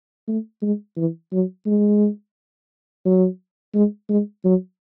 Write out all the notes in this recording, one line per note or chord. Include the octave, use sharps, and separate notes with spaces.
A3
G#3
E3
F#3
G#3
F#3
G#3
G#3
F#3